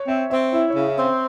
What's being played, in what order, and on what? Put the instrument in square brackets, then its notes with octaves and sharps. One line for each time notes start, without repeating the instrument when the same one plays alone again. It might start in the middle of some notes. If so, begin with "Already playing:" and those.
Already playing: [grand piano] C#5
[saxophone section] C4 [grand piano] E5
[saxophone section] C4 [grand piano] E5
[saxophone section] E4 [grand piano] E5
[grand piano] C#5
[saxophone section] C#3
[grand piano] E5
[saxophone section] C4
[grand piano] C5